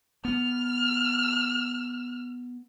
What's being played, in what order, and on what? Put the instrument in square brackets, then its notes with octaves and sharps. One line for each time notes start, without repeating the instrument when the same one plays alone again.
[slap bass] B3 [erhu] F6